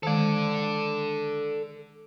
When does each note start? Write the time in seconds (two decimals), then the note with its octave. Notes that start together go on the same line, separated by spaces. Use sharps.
0.03 D#3 G#3 A4 D5